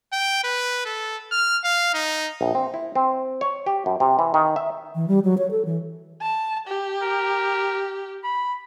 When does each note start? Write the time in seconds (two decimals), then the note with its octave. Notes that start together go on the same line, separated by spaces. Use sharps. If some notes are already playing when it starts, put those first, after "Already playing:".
0.12 G5
0.44 B4
0.85 A4
1.31 F6
1.64 F5
1.94 D#4
2.41 A#1
2.55 C4
2.74 E4
2.95 C4
3.41 C#5
3.66 G4
3.86 F#2
4.00 C3
4.19 E3
4.34 D#3
4.56 E5
4.95 E3
5.08 G3
5.24 F#3
5.38 C#5
5.51 A4
5.65 E3
6.21 A5
6.68 G4
7.02 A#4
8.24 B5